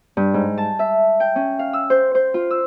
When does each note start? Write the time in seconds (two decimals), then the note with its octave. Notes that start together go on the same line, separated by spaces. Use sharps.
0.17 G2
0.34 G#2
0.58 A5
0.79 E5
1.20 G5
1.36 C#4
1.59 F5
1.73 E6
1.90 C5
2.15 C5
2.34 F4
2.51 E6